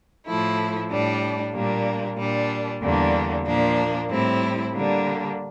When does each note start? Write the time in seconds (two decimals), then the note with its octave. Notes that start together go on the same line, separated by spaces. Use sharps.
0.25 A2 F3 A3 E4
0.89 A2 G3 D4
1.53 A#2 G3 A#3 D4
2.17 A#2 G3 D4
2.81 E2 D3 G3 A#3 D4
3.45 A#2 F3 A#3 D4
4.09 A2 G3 C4 E4
4.73 D3 G3 A#3 D4